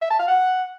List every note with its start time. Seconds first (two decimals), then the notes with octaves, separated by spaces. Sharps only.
0.02 E5
0.10 A5
0.19 F5
0.28 F#5